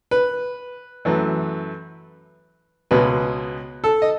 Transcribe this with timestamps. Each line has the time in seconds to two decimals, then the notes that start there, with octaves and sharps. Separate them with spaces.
0.11 B4
1.05 F#2 E3 A3
2.91 C#2 B2 G#3 B4
3.84 A4
4.02 D#5